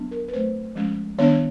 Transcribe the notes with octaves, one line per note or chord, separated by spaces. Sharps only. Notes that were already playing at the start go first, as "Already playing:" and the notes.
Already playing: F#3 B3 D4
A#4
B4
F#3 A3 C4 C5
F3 G#3 C#4
D#3 G3 B3 D4 C#5